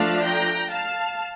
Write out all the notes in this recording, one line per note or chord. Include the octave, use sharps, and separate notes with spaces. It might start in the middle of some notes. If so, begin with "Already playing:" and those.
Already playing: F3 A3 D4 F5 A5
G5 A#5
F5 A5